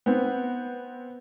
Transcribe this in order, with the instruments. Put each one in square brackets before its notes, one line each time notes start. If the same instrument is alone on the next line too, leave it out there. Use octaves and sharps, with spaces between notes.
[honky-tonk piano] B3 C4